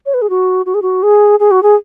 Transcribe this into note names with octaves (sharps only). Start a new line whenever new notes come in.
C#5
B4
G#4
F#4
F#4
G#4
F#4
G#4
G#4
F#4
G#4